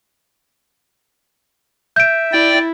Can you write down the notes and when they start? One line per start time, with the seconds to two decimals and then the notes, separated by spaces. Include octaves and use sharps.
1.96 E5 G6 D7
2.33 E4 D5 G5